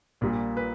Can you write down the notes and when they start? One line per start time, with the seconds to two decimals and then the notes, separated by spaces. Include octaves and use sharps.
0.21 A#1 A#2 G3
0.57 B4